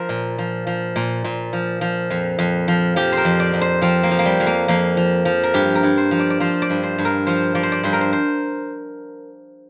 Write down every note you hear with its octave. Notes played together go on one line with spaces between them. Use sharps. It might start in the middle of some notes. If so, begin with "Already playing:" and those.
Already playing: F3 A#4 C5
A#2
F3
F3
A#2
A#2
F3
F3
F2
F2
F3
F3 G4
A#4 C5
F2
D5
F2
C5
F3 C4
A#3
F3
A#3
G3
F2
A#3
F2 A#3
F3
F3
A#4
G2 G4
A#4
G2
C5
F3
D5
D5
F3 C5
D5
G2
C5
G2
A#4
F3 C5
F3 D5
C5
D5
G2 C5
A#4
C5
C5